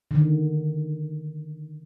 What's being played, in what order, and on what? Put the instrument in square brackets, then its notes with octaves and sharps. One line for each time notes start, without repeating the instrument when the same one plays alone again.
[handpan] D3 D#3